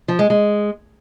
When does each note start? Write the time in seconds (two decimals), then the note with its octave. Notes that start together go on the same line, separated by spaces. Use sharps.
0.08 F3
0.19 G#3
0.30 G#3